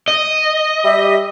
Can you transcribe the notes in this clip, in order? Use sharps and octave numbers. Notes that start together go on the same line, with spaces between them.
D#5
G3 G4 E5